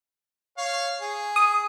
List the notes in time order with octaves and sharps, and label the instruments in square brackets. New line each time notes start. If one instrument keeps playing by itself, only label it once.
[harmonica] C#5 F5
G#4
[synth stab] D#6